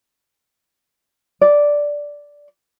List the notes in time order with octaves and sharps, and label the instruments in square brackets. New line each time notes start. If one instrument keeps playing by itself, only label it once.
[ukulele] D5